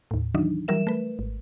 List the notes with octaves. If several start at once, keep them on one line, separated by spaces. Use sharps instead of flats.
D#2 A2
D#3 E3 F#3 D4 D#4
E3 F#3 G3 A#4 E5 E7
A3 B4
G#1